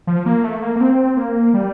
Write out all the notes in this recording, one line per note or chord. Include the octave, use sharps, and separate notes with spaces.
F3
A#3
A3
A#3
A#3
C4
A#3
G3